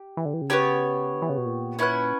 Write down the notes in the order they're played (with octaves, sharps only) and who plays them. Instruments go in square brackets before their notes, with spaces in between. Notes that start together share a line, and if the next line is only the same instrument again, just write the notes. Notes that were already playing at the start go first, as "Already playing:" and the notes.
Already playing: [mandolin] G4
[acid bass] E3
D3
E3
C#3
[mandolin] B3 E4 G4 C#5
[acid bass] D3
E3
C#3
B2
A#2
[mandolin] C#4 E4 B4 F#5